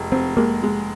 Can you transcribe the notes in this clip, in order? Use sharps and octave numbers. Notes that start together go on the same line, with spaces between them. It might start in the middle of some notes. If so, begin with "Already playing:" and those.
Already playing: F1 G#3
F1 C4
G#3 A#3
G#3